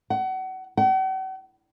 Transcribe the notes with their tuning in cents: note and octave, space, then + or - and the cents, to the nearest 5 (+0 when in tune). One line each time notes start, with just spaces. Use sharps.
F#5 +30
F#5 +45